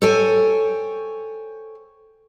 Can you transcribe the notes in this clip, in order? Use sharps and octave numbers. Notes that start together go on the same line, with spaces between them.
A4 C5 C#5 G5 G#5